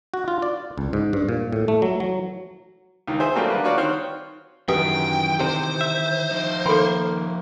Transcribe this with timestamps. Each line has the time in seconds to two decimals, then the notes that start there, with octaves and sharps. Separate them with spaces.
0.14 F#4
0.28 F4
0.42 D5
0.78 C#2
0.93 G#2
1.13 G2
1.29 A#2
1.52 A2
1.68 A3
1.82 F#3
2.00 F#3
3.07 C#2 D#3
3.20 G#4 C5 E5 G#5
3.35 F#3 G3 A3 A#3 C4 F4
3.50 D3 G3 F4 G4 A#4 B4
3.64 F#4 B4 C#5 D5 F5
3.77 D#3 C4 C5 C#5 F6 F#6
4.69 F#2 D#3 E3 G4 B4 G5 D#6
5.41 C3 C5
5.81 E5
6.31 F3 D#4
6.66 D#3 A#3 A4 B5 C6